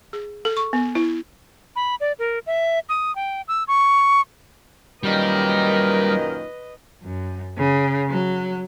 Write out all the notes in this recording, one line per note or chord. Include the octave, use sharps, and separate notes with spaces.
G#4
A4
C#6
B3
E4
B5
D5
A#4
E5
D#6
G5
E6
C#6
F#2 A#2 D#3 G3 A#4 B4 D#5
F#2
C#3
F#3